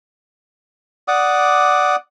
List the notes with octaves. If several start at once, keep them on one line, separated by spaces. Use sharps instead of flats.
D5 F#5 D6 D#6